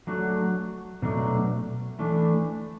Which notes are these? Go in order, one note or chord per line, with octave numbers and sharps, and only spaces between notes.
F#3 A3 D4 F#4
B2 F#3 A3 D4
E3 A3 D4